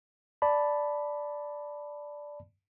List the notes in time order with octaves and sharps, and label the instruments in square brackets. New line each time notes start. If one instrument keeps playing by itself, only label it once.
[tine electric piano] D5 A5 B5